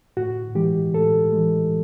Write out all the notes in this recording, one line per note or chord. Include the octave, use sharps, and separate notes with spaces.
A2 F#4
E3 G#3 G4
A2 A4
E3 G#3